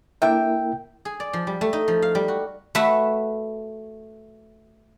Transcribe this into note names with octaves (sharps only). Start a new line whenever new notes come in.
A#3 D4 E4 A4 A#4 E5 G5
G#4
D5
F3
G3
A3
D#4
F3
F5
G3
F#4
A3 F#4 B4 E5